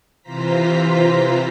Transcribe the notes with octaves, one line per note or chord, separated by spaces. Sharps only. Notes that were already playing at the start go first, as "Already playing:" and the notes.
C3 E3 F4 C5 A#5 B6